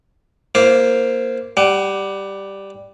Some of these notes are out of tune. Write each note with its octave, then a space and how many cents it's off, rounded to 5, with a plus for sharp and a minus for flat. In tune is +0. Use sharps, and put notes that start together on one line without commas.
A#3 +0 E4 +40 C5 +0
G3 +0 F#5 +30